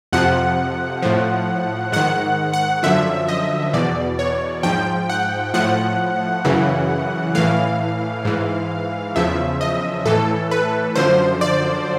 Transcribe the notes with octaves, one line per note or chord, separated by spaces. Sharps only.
F2 C3 F3 F#5
A2 F3
G#2 D#3 F#5
F#5
F#2 D3 F3 E5
D#5
E2 B2 D5
C#5
G#2 F3 G5
F#5
A2 F3 F#5
F#2 C#3 E3
A2 E3 F5
G#2 E3
E2 C#3 F3 E5
D#5
A2 E3 A4
B4
F#2 D3 F3 C5
D5